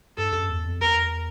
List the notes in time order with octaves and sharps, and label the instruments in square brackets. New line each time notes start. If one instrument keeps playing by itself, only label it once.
[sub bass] G2 [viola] A4
[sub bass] F#2
E2
F2
[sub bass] E2 [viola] A#4